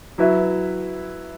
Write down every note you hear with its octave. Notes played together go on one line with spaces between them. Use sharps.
F#3 E4 B4 E5